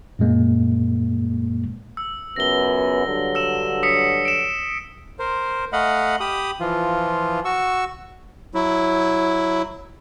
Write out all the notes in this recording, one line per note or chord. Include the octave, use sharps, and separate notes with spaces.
F#2 A#2 G#3 A#3
E6
C#2 F#2 B3 A#6 G7
G2 D3 F#3
E6 E7
D#6 B6 C#7
D7 E7
A#4 C5
A3 D#5 F5 F#5 B5
G4 B5 D#6
E3 F3 F4
F#4 C#6 E6
F#3 E4